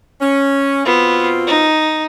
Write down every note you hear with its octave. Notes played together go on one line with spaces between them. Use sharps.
C#4
B2 B3 C4 F4
D#4